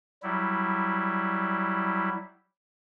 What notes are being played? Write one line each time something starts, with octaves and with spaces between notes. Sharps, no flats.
F#3 G3 E4